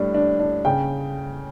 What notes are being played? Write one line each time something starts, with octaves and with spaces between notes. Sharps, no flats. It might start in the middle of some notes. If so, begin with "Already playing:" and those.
Already playing: A2 G3 D4
D4
D4
C#3 G5